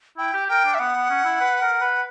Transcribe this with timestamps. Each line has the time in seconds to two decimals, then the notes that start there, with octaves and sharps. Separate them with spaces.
0.18 E4 G5
0.33 G4
0.48 A#4 G5
0.65 D4
0.74 E5
0.79 B3 F#5
0.95 B3
1.10 C#4
1.25 E4
1.40 B4
1.61 A#4
1.81 B4